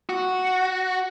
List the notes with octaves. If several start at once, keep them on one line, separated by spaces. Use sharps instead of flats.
F#4